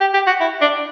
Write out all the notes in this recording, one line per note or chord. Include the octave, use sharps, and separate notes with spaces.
G4
G4
F#4
E4
D4